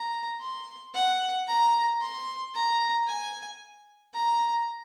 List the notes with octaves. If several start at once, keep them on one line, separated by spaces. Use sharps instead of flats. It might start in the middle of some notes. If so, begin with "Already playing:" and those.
Already playing: A#5
C6
F#5
A#5
C6
A#5
G#5
A#5